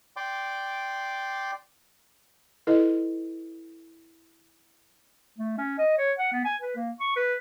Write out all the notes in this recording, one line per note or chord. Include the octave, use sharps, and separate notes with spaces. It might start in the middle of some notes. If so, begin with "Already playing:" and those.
D5 G5 C6 D6
E4 A4 B4 D#5
A3
C#4
D#5
C#5
F#5
B3
G#5
B4
A#3
C#6
B4